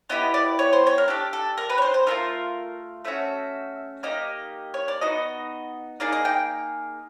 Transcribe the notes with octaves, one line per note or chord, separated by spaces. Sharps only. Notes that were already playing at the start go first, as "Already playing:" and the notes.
B3 E4 G4 D#5
D5
C#5
C5
C#5
A#4
D4 G4 A4
A4
A#4
B4
C#5
C5
C5
A3 D4 F4 A#4
A3 C#4 F#4 E5
A#3 D#4 G4 D#5
C#5
D5
B3 D#4 F#4 D#5
A#3 D#4 G#4 D5
D#5
G5